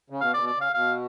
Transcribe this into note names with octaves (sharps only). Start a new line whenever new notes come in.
C#3
B2 F5
C#3 D5
B2
D5
C#3
F5
B2 F5